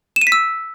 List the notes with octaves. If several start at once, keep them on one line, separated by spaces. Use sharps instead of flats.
E7
D#7
B6
E6